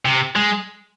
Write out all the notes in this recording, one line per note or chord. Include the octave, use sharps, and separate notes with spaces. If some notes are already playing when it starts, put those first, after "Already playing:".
C3
G#3